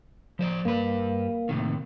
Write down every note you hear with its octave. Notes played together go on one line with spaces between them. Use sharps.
F3 C5 D5
G2 A#3 B4
A2 C3 D#3